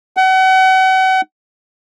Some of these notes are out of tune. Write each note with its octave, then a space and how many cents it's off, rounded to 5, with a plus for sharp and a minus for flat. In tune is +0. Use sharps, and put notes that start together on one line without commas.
F#5 +35